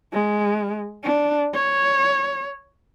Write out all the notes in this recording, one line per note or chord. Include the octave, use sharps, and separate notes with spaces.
G#3
D4
C#5